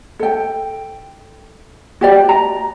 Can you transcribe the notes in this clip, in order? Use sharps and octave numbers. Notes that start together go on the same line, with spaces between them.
A4 G5
F#4 G4 D5
A#5